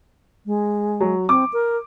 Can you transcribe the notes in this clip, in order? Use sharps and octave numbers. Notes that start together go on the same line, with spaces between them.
G#3
F#3
C4 D6
A#4